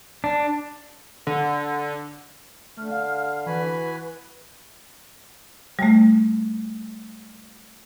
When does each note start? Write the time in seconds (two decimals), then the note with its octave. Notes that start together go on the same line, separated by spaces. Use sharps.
0.24 D4
1.27 D3
2.77 D3 A3 F6
2.91 F5
3.46 E3 F#4 B4 G#5 B5
5.79 G3 A3